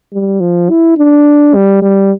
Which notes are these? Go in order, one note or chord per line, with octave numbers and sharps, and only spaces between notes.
G3
F3
E4
D4
G3
G3